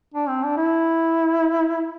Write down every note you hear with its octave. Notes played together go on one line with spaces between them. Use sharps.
D4
C4
D4
E4